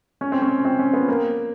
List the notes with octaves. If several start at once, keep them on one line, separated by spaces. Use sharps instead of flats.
C#4
C4
C#4
C4
C#4
B3
A#3